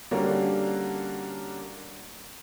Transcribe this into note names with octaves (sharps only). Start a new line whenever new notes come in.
D3 G3 A#3 C#4 D4 F#4